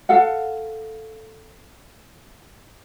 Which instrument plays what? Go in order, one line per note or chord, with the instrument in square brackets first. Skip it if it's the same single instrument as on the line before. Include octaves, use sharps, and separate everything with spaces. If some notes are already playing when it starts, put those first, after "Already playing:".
[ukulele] A4 F5 F#5